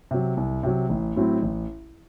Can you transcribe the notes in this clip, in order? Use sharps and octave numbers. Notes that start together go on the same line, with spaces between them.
C3 F#3
C2
C3 F#3
A1
A2 F#3 C4 E4
A1